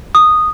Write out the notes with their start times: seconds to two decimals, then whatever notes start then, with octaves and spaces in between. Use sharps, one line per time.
0.15 D#6